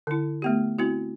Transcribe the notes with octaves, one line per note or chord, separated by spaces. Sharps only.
D3 E4
A3 B3 G4
C4 E4 F#4